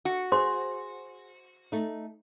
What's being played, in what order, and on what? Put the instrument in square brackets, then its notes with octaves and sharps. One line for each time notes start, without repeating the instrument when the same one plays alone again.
[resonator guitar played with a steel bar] F#4
[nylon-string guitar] G#4 [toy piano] C5 C6
[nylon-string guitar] A3 D#4